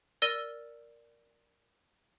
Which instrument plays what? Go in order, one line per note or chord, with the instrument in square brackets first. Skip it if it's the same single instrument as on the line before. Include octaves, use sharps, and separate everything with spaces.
[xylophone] A#4 D5 E6 A#6 D#7 G7